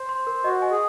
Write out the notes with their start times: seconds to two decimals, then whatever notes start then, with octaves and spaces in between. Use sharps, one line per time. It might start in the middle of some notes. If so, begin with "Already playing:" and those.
Already playing: C5
0.09 C6
0.27 A#4
0.44 F#4 D#5
0.62 G#5
0.71 G#4